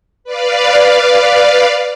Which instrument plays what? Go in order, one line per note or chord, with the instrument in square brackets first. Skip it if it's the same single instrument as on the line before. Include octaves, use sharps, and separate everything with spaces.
[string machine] B4 D5 F5